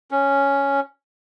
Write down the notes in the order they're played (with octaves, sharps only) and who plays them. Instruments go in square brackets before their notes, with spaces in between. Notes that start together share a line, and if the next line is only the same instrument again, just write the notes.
[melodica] C#4